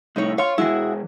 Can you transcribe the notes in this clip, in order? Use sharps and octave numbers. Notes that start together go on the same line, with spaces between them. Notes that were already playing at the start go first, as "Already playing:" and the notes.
C2 A2 D#4 E4 C#5
C#5 F5 C6
E3 G#3 E4 F#4 G#4